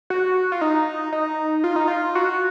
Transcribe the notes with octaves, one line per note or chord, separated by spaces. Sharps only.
F#4
F4
D#4
D#4
F4
D#4
F4
F#4